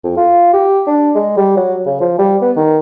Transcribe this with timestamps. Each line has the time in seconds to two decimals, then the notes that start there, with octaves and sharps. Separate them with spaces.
0.04 F2
0.17 F4
0.53 G4
0.87 D4
1.15 G#3
1.37 G3
1.57 F#3
1.86 C#3
2.01 F3
2.19 G3
2.42 B3
2.56 D#3